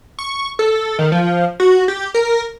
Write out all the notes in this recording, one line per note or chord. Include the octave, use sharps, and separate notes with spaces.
C#6
A4
D#3
F3
F#4
G4
A#4